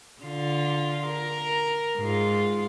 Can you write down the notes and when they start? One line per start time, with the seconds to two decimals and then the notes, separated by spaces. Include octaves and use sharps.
0.22 D3 F4
1.06 A#4
1.98 G#2 F4